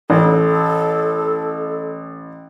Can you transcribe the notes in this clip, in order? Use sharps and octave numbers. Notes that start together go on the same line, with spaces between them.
A1 A4